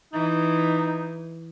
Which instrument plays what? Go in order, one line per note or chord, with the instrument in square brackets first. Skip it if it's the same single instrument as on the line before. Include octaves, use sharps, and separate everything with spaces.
[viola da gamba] E3 [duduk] D#4